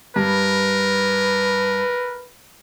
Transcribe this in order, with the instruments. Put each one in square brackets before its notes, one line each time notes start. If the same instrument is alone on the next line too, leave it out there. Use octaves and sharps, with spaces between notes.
[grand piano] G2 [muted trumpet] A#4 [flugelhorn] B4